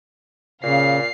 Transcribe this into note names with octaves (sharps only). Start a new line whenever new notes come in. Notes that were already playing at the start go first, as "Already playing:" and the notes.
A#2 C#3 F5 C7